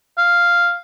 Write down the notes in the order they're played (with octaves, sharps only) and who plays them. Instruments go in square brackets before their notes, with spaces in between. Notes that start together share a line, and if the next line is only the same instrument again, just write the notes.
[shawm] F5